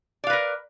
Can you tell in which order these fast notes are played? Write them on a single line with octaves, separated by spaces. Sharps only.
D5 F5 B4 A#4